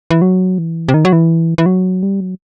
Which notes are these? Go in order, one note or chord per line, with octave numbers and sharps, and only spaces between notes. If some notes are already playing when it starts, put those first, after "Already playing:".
E3
F#3
E3
C3
D#3
F#3
E3
E3
F#3
G3
F#3